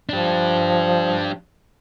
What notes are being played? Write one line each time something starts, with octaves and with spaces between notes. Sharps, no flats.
F3 D4 G4